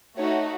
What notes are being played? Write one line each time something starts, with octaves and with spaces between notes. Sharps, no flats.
A3 D#4 F#4 C#5